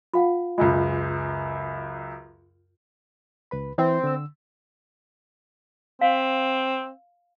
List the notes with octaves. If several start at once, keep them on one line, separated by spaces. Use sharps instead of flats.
F4 F5 F#5
C#2 F#2 G#3 F4
C#2 B4 B5
E3 C4 E4 C5
D3 E6
C4 F5